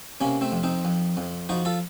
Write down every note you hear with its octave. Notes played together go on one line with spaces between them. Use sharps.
C3 A#3 C#4
A3 C4
F2
C4 D#4
F2
F2
F3 D#4 F#4
F4 A4